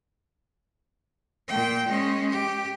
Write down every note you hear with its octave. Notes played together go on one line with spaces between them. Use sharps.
A#2 G5
G#3 C#4
G4